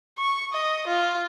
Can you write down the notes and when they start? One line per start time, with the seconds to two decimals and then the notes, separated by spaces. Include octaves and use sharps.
0.18 C#6
0.53 D#5
0.87 F4